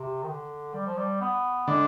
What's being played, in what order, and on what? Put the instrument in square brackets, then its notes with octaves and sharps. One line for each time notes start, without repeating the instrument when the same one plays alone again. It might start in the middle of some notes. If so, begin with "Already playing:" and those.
Already playing: [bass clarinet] C3
D#3
D3
G3
F3
G3
B3
[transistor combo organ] D3 [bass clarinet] G#3